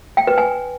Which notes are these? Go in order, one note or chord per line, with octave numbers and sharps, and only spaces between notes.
G5
B4
G#5